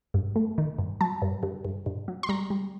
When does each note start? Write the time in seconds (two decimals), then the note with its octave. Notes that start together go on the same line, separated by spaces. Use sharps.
0.14 G2
0.36 A3
0.58 D#3
0.78 G2
1.01 F#3 A5
1.22 G2
1.43 G2
1.65 G2
1.86 G2
2.08 F#3
2.23 C6
2.29 G3 A#5
2.50 G3